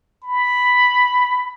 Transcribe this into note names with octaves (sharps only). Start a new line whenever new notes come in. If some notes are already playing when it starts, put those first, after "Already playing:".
B5